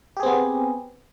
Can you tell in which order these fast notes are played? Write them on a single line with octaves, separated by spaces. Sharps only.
G4 G#4 C4 B3